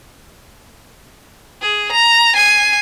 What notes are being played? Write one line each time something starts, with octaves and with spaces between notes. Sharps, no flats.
G#4
A#5
G#5 C7